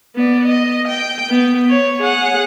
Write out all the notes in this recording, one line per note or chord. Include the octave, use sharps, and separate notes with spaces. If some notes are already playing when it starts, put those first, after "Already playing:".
B3 D5
D#5
G5
B3
C#5
G#4 F#5